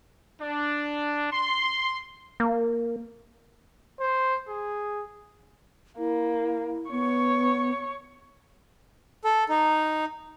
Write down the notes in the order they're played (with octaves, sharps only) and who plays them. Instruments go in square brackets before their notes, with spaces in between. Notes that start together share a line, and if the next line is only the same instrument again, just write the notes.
[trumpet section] D4
C6
[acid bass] A#3
[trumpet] C5
G#4
[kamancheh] A#3 [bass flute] E4
[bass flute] B3 [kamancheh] C#5 C#6
[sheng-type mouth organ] A4
D#4